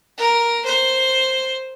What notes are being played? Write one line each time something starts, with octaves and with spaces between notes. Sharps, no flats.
A#4
C5